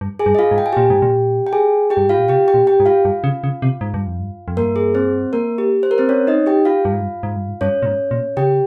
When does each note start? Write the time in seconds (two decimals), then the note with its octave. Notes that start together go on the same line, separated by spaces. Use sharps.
0.01 G2
0.19 G#4 G#5
0.26 G2
0.35 D#5
0.39 F4 F5
0.51 G#2
0.58 G5
0.66 G#5
0.73 A#2 G4 G5
0.90 G#2
1.02 A#2
1.47 G5
1.53 G#4 G#5
1.90 G4 G5
1.97 G2
2.08 G#2 F4 F5
2.18 A#2
2.28 C3 G4 G5
2.48 G4 G5
2.54 A#2
2.67 G4 G5
2.80 G#2
2.86 F4 F5
3.05 G2
3.24 C#3
3.44 C#3
3.62 C3
3.81 G#2
3.94 G2
4.07 F2
4.19 G2
4.48 F2
4.57 G2 A#3 A#4
4.76 G#4
4.95 C4 C5
5.33 A#3 A#4
5.58 G4
5.83 C5
5.91 A#4
5.98 C4 C5
6.09 C#4 C#5
6.27 D#4 D#5
6.46 G4 G5
6.65 F4 F5
6.85 G2
6.93 G#2
7.01 G2
7.23 G#2
7.36 G2
7.48 G#2
7.61 G2 C#4 C#5
7.82 A#2
7.86 G#2
8.11 A#2
8.37 C#3 G4 G5